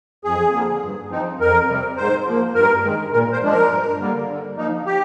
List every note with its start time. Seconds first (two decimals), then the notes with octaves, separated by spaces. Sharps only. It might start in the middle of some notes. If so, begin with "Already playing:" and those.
0.24 F2 G#4
0.53 D3 F3 A#3
0.83 G2
1.11 F3 C4 D#4
1.39 F2 A#4
1.69 C3 G3 C4
1.97 G#2 C5
2.26 F3 A#3
2.55 G2 A#4
2.84 D#3 G#3
3.13 A#2 A#4
3.33 C5
3.42 F3 G#3 D4
3.52 A#4
3.71 G2
3.99 D3 G3 A#3
4.29 D3
4.57 F3 A#3 D#4
4.86 G4